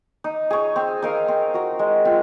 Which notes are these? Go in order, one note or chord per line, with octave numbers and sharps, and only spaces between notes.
D#4
G#4 C#5
C4
D#4 A#4 F5
C4
F#4 A#4
G#3
C4 F4